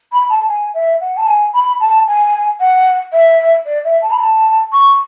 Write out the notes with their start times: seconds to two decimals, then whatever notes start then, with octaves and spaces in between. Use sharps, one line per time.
0.12 B5
0.30 A5
0.48 G#5
0.74 E5
1.01 F#5
1.17 A5
1.27 G#5
1.53 B5
1.80 A5
2.08 G#5
2.60 F#5
3.13 E5
3.66 D5
3.85 E5
4.02 A5
4.11 B5
4.19 A5
4.73 C#6